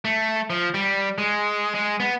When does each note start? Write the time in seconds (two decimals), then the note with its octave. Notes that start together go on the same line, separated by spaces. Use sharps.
0.05 A3
0.50 F3
0.74 G3
1.18 G#3
1.74 G#3
2.00 B3